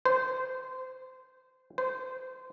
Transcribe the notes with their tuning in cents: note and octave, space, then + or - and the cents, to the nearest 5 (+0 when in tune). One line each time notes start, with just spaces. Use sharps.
C5 -20
C5 -20